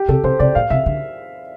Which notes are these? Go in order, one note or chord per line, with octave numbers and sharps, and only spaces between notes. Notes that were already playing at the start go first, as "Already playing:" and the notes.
Already playing: G4
C3 A4
C3 C5
C3 D5
A#2 F5
C3 E5
D3